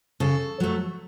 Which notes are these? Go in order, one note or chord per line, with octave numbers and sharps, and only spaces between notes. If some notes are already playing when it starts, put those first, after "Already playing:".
C#3 A4
F#3 A3